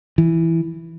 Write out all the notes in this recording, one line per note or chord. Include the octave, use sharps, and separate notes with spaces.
E3